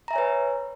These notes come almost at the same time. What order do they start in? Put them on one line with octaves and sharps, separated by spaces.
A#5 E5 G#5 C#5 B4